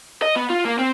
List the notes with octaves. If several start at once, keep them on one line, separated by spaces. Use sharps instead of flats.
D#5
B3
F4
A#3
C4